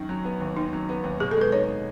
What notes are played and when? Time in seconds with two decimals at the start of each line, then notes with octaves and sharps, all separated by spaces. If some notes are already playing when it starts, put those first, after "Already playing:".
Already playing: F#2 D#3
0.09 F#3
0.25 B3
0.40 D#2
0.56 D#3 D#4
0.73 F#3
0.89 B3
1.04 D#2
1.20 B2 G#4
1.31 A4
1.37 G#3 B4
1.52 D#4 C#5